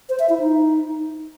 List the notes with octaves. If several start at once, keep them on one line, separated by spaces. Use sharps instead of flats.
C5
E5
E4
D#4